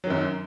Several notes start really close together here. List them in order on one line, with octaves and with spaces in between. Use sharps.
F#3 D#3 F#2